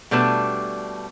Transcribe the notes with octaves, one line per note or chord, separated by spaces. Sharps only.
B2 G3 A3 D4 B4 A5